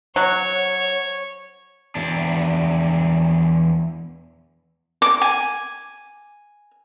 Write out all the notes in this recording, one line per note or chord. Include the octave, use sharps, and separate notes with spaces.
F#3 C#5
E2 D4
D6
G#5